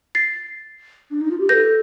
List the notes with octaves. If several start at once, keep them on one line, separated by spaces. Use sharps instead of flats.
A6 C7
D4
D#4
F4
G4
A4 B4 G6 A#6